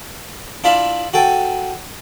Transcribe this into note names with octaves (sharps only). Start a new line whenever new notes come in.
D4 E4 F4 E5 F5
F#4 A4 G5 G#5